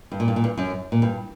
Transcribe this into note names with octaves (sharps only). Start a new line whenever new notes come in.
G2
A#2
G2
A#2
G2
F#2
A#2
G2